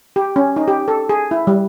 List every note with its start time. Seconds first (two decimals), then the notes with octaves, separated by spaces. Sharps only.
0.16 G4
0.36 C#4
0.56 D#4
0.68 G4
0.88 A4
1.09 G#4
1.31 E4
1.47 G3